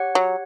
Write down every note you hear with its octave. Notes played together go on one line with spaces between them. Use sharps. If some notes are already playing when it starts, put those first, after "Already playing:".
Already playing: G4 C#5 F#5
F#3